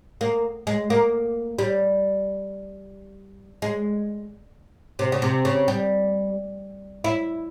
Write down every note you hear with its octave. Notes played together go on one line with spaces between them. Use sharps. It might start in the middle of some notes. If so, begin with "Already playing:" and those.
A#3
G#3
A#3
G3
G#3
C3
C#3
C3
C#3
G3
E4